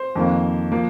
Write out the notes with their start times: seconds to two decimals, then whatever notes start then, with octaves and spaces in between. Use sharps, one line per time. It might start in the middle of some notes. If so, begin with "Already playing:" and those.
Already playing: C5
0.15 F2 D#3 A#3
0.72 F3 A#3